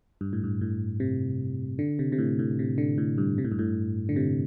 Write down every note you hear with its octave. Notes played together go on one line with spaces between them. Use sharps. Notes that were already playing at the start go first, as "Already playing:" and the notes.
G2
A2
G2
A2
C3
D3
C3
C3
A2
A2
C3
D3
A2
G2
C3
A2
G2
A2
D3
C3